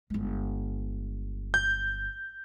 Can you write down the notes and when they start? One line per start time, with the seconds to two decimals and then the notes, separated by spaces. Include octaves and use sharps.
0.10 G1 G#3
1.54 G6